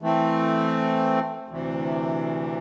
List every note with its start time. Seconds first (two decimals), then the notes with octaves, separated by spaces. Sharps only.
0.02 E3 A3 C4
1.48 D2 C3 E3